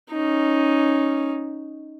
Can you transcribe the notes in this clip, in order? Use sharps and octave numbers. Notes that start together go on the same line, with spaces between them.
C#4 D#4